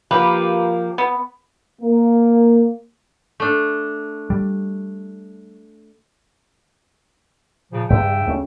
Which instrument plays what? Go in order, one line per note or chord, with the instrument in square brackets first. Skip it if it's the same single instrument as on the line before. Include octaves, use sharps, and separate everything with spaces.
[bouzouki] F3 A#3 G4 [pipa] B4
[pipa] B3
[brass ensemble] A#3
[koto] A3 D4
[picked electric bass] G3
[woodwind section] A#2 C#3 F3
[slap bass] G2 [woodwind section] C#3 E5 G5
[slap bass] D2 A3 C#4